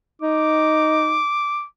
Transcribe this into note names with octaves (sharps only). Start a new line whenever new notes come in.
D#4 D6